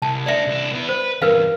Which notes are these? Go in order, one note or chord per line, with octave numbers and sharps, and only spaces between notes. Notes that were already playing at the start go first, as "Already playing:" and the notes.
C2 A5
A3 D4 D5 E5
C2 D4
B3 E4
B4 C5
E2 G2 A#4 B4 F5